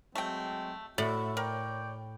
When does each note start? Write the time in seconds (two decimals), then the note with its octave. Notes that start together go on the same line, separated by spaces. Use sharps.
0.15 F#3 G#3 A3 C4 G5
0.98 A2 F#4 D5 E5
1.37 A#4 C#5 D5 G5